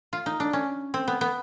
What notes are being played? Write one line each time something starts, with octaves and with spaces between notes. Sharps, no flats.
F4
D#4
D4
C#4
C4
B3
B3